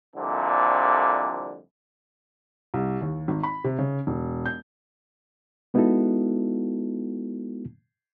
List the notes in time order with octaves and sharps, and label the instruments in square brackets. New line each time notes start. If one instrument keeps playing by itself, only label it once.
[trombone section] C2 F2 A#2 D3
[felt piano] C2
D#2
G#1
B5
C3
C#3
E1
G6
[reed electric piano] G#3 B3 D#4 E4 F#4 A4